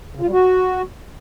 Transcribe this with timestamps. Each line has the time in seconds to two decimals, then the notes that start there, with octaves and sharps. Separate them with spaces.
0.15 C#3
0.21 F4
0.27 G3
0.32 F#4